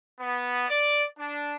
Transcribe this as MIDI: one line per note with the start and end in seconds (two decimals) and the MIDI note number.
0.20 0.67 59
0.69 1.04 74
1.18 1.55 62